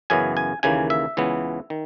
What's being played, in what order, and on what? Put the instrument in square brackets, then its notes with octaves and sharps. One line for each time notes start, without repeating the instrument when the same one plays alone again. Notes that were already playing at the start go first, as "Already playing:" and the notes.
[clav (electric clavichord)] F#2 C#3 E3 B3 G#5
G#5
D#2 C#3 E3 A#3 G#5
E5
C#2 C#3 E3 B3
D#3